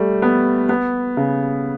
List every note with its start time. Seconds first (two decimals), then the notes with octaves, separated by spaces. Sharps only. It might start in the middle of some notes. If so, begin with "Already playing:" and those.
Already playing: G3 A3
0.22 B3
0.69 B3
1.17 C#3